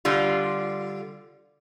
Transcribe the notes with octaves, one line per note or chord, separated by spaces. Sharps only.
D3 G3 F4